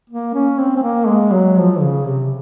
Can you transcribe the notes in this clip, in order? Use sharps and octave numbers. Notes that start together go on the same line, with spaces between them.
A#3
C#4
C4
C4
A#3
G#3
F#3
F3
C#3
C3